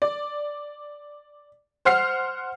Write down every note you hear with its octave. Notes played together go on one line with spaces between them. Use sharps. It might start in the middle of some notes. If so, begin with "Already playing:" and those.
D5
C5 F#5 F6 C7